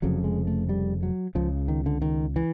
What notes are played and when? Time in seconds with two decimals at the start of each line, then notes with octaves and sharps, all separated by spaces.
0.02 F1 F2 C#3 F#3
0.24 G#3
0.47 A3
0.69 G3
1.03 F#3
1.35 C#2 C#3 F3
1.68 D#3
1.86 D3
2.02 D#3
2.36 E3